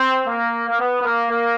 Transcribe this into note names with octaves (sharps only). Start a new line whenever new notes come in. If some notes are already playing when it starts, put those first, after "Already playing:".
Already playing: C4
A#3
A#3
B3
B3
A#3
A#3